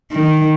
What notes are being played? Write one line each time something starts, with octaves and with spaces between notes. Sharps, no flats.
D#3